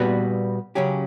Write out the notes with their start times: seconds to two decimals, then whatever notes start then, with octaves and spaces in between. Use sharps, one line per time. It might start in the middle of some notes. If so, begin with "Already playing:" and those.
Already playing: A#2 G3 B3 F#4 B4
0.75 C#3 F#3 C#4 G4